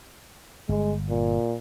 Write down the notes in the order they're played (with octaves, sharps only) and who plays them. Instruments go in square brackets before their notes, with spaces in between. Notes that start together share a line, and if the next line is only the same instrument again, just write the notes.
[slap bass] G1 [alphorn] G#3
[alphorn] A#2